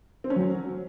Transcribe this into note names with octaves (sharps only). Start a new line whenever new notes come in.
C4
C#4
F#3